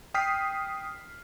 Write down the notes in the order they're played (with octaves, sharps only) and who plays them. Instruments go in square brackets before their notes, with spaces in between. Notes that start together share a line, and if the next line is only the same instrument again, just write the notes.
[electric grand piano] G5 D#6 F6 B6 C7